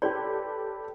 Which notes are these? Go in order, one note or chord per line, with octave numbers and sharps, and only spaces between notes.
G4 A4 B4 C#5 D5 C6